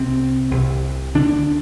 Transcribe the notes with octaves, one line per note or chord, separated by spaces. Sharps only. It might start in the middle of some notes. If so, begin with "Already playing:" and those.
Already playing: C2 C3 C4
C2 C3
D2 D3 D4